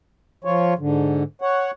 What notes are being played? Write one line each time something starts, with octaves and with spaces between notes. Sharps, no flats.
F3 F4 C#5
G#2 D3
C#5 F#5